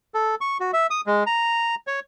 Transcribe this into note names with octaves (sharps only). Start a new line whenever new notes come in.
A4
C#6
F#4
E5
D#6
G#3
A#5
C#5